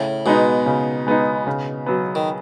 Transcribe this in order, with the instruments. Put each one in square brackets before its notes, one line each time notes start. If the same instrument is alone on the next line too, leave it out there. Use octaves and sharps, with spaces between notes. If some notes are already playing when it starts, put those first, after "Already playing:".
Already playing: [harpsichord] A2 [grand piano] C#3
[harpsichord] B2 [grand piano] G#3 B3 D#4
[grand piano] C#3
G#3 B3 D#4
C#3
F#3 B3
[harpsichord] D#3